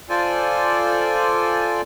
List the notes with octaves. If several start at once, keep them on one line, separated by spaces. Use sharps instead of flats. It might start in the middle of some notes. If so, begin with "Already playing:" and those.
F4 A4 C5 D5 G#5